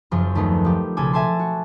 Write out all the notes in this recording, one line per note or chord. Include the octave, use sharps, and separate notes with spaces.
F#1 F#2 F3 F4
D#2 A3 B3 D#4
F3 G4
B1 C#3 A4 G#5 D6
E5 G#5 A5 C6
F#4